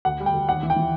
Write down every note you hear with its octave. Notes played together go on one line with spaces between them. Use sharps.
D2 F#5
G3
G5
D2
D#2 F#5
E3
G5
E3